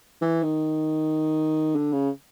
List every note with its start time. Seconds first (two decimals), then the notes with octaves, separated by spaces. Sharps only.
0.22 E3
0.43 D#3
1.76 D3
1.92 C#3